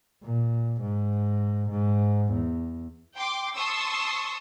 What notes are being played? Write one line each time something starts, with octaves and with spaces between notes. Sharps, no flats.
A#2
G#2
G#2
E2
G5 C6 D6
A5 C6 C#6 D#6 E6